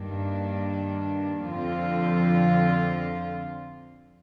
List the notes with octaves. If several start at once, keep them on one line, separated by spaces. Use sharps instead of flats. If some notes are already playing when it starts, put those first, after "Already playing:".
Already playing: G2 D#3 A#3 D4
F2 D3 F3 C4 F4